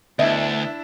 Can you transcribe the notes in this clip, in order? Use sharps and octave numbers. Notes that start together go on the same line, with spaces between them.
D2 B3 D4 E4 D#5 E5